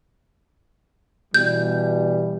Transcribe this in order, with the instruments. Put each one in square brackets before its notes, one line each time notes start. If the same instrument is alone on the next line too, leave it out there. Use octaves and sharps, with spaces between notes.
[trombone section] B2 E3 G3 [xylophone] G6